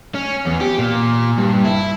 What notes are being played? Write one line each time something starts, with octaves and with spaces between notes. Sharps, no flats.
C#4
E2
G4
A#2
G2
E4